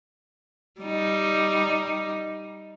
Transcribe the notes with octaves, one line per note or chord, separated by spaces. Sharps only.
G3 D#4